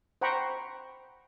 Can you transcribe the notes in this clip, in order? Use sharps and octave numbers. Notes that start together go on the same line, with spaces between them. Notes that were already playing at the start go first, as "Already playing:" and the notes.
C5 F#5 G5 A#5 B5 C#6